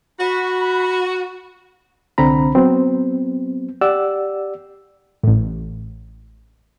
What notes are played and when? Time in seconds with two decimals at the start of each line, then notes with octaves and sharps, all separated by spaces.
0.20 F#4 B5
2.18 C2 D3 C4 A#5 B5
2.55 F#3 B3 C4
3.81 G4 D5 F#5 E6
5.23 A1 A2